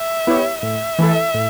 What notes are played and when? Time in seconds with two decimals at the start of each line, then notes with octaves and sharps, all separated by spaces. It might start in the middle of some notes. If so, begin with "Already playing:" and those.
Already playing: E5
0.27 B3 E4 G4 C#5
0.63 A2 E5
0.99 E3 A3 E4 A4
1.34 A2